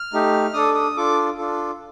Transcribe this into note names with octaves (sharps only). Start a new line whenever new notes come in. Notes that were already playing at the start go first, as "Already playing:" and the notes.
Already playing: F6
A3 D#4 G4
D4 A4 D#6
D#6
D4 F4 A4 D6
D4 F4 A4